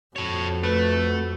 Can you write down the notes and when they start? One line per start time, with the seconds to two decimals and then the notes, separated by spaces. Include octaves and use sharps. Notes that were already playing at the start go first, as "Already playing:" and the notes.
0.16 F2 F#4 A4 C#5
0.63 A3 B4